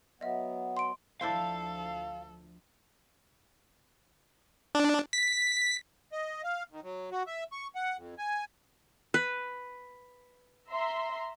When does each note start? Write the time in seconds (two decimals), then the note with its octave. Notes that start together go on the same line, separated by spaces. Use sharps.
0.21 F#3 B3 D#5 E5
0.77 C6 D7
1.21 D2 F3 D4 E4 A4 C5 F5
4.75 D4
5.13 B6
6.12 D#5
6.44 F5
6.72 D#3
6.83 F#3
7.11 F#4
7.27 E5
7.52 C#6
7.75 F#5
7.97 F2
8.18 G#5
9.14 B4
10.69 E5 A#5 C6